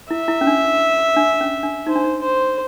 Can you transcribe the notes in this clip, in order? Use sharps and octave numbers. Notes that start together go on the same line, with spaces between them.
E4 E5
E4
C#4
D4
D4
C#4
D4
D#4 C5
D4
D#4
C5